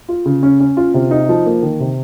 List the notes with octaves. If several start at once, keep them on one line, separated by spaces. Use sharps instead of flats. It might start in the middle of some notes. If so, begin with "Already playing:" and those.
F4
C#3
C#4
C#4
F4
C3
D#4
F3
A#3
D#3
C3